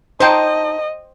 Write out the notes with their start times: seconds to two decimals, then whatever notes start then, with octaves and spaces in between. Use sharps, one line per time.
0.20 D#4 C5 D#5 G5 A5